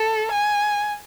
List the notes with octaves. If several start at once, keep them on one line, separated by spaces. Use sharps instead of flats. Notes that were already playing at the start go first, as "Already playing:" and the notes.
Already playing: A4
G#5